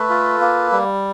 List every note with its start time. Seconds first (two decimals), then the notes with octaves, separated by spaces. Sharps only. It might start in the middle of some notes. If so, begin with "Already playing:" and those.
Already playing: A3 A4 B4
0.10 F4
0.41 A#3
0.72 G3